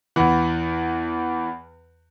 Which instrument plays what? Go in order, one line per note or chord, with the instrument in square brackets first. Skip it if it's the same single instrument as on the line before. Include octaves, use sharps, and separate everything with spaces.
[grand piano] E2 E3 F#5